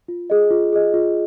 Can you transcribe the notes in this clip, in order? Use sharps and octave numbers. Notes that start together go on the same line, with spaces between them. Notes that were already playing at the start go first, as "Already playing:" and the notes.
F4
G#4 D#5
F4
G#4 D#5
F4